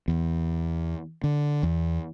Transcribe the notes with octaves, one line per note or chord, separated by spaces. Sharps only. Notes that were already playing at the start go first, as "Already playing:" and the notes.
E2
D3
E2